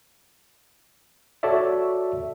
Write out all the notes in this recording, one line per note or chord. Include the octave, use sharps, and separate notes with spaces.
F#4 A4 C#5 D5 E5